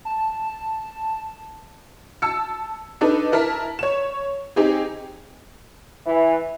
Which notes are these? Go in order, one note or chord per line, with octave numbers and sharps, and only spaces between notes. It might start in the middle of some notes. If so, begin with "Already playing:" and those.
A5
A5 E6 C#7
D4 D#4 A4 B4 D#5
E4 A#4 A5 B6
C#5 E7
C4 D#4 G4 G#4
E3